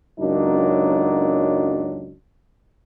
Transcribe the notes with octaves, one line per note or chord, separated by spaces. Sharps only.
C#2 F#2 F#3 A#3 D4 D#4